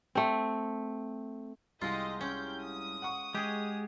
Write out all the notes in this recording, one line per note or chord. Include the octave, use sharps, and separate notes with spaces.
A3 C4
C2 G#3 F4 G4 D#5
C#4 G5 G6
D#6
F#5 C#6
G#3 G4 G#4